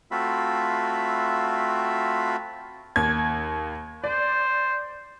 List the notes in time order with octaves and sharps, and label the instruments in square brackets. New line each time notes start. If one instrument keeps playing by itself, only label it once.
[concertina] A3 C4 F4 F#4 E5 B5
[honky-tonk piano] D#2 G#6
[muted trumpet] C5 [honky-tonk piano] D5